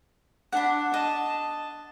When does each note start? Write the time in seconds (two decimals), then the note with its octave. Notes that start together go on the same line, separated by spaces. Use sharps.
0.52 D4 F#5 B5
0.94 D#5 A5